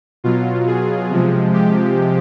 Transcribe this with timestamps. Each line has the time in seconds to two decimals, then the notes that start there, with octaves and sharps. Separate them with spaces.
0.24 B2 F#3 F4
0.67 G#4
1.11 C3 F3 G#3
1.53 G4